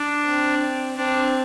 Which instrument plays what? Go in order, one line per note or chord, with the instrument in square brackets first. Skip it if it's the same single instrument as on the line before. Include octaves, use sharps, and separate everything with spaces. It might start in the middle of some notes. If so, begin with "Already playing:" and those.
Already playing: [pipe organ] D4
[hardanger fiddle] C4
[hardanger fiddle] C4 [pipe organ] D4